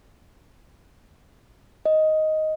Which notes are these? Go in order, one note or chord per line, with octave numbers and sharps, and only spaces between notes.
D#5